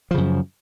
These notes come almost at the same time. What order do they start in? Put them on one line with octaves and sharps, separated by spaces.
F3 C#3 F#2